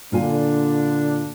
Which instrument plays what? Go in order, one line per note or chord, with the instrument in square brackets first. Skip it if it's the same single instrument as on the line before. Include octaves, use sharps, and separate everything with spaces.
[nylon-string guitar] A#2 F4 G#5 [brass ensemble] D3 D4